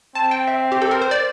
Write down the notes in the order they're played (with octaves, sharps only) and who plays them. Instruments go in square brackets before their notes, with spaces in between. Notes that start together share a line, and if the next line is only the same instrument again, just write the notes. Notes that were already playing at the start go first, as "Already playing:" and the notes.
[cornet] C4 [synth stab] A5
[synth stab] G5
E5
G4
A4
A#4
C5
D5